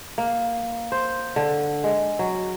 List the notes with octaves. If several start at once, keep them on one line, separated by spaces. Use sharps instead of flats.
A#3
C5
D3
G#3
F#3